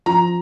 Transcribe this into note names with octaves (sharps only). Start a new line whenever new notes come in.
F3 A#5